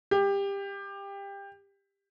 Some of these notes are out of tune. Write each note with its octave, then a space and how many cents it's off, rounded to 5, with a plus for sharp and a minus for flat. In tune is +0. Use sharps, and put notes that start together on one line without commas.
G4 +20